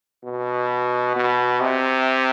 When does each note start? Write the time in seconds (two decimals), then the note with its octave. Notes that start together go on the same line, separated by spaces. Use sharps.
0.24 B2
1.16 B2
1.60 C3